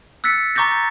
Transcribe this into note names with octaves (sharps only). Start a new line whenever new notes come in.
E6 F#6 A6 B6 C#7
A#5 C#6 D6 G6 A6 A#6
A6